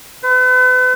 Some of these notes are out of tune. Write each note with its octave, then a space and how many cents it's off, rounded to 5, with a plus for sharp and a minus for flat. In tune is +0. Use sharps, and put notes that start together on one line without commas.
B4 +40